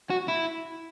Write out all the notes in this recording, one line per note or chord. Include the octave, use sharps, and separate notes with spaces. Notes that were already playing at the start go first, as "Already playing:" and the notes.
F#4
E4